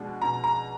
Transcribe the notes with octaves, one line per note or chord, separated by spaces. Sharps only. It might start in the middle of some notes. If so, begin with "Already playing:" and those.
Already playing: B2 G#3 B3 D4
B2 A#5
A#5